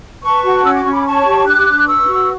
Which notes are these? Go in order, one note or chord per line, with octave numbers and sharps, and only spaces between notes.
B4 A5 C#6
F#4
C#4 E6
D6
C#4 C#6
B5 D6
C#5 A5 C#6
G4
D4 D6 F#6
D4
B4 C#6 E6
F#4